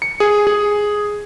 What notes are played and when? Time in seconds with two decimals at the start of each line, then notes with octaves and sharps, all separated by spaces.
0.02 C#7
0.20 G#4
0.47 G#4